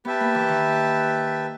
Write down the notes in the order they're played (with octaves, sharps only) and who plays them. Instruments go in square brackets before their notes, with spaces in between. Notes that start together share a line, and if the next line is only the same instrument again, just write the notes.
[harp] B3 [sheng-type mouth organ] G4 B4 E5 A5
[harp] A#3
E3
D#3